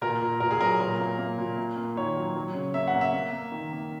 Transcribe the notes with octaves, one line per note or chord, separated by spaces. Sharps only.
A#2 A#4
A#2
A#2 A#4
G#4
F#3 A#4
A#2 A#4
A#3
A#3
A#2
A#3
A#3
D#3 C#5
F#3
F#3
C#3
A#3 E5
F#5
A#3
E5
A#3
A#3
D#3
A#3